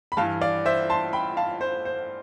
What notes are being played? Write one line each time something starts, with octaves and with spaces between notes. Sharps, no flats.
B5
G2 E3 F5 A5
D5 F5
C5 E5
A5 C6
G5 B5
F5 A5
C5
C5